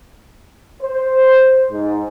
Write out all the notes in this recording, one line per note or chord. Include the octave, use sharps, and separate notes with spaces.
C5
G#2